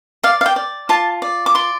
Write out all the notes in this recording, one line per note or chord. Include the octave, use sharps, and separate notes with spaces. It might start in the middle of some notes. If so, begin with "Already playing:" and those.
D5 F5
F5
G5
D5
F4 A5
D5
D6
D5 C6